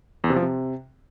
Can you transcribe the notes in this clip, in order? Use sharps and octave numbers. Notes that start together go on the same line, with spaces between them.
E2
C3
F3
C3